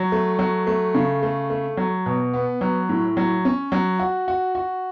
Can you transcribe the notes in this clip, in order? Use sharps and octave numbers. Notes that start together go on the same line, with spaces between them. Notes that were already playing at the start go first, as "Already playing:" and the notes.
Already playing: F#3
A3
F#3
A3
C#3
A3
A3
F#3
B2
B3
F#3
A2
F#3
C#4
F#3
F#4
F#4
F#4